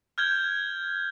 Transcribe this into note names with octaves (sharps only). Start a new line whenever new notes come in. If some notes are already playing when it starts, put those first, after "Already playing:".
F6 G6 G#6 G7